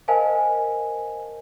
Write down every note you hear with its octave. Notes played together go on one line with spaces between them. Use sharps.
A#4 C5 D#5 F5 G#5 A5